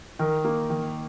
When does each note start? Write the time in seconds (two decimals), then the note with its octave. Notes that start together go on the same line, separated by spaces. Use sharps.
0.19 D#3 A#4
0.45 A#3
0.70 D#3